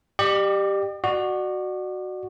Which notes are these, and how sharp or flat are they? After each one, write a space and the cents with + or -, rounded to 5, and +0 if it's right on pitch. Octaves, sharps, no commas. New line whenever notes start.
G4 +0 D5 +45
F#4 +0 D5 +35